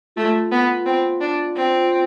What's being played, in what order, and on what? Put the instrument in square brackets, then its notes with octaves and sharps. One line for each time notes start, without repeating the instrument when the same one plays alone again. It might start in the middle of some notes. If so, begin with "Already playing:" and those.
[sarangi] A3 [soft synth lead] F4
[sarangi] B3
C4
D4
C4